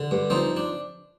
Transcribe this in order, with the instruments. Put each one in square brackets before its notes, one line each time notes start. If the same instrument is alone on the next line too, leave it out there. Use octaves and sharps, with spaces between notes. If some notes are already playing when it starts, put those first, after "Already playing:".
Already playing: [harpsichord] D3
G2
F3 C4 D#4
D4